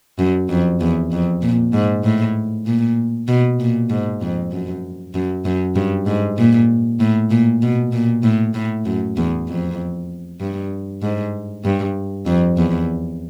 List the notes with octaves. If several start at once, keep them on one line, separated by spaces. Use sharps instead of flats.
F#2
F2
E2
F2
A#2
G#2
A2
A#2
B2
A#2
G#2
F2
F#2
F#2
F#2
G2
G#2
A#2
A2
A#2
B2
A#2
A2
A2
F#2
E2
F2
G2
G#2
G2
F2
E2